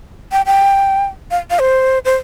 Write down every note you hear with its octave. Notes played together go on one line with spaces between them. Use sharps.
G5
G5
F5
F5
C5
C5